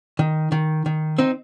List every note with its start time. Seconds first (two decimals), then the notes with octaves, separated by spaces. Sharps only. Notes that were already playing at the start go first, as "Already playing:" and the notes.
0.19 D#3
0.52 D#3
0.86 D#3
1.18 C4 D#4